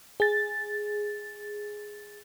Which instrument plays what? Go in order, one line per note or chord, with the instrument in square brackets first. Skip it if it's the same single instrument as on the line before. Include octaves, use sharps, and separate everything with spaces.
[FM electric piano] G#4 A6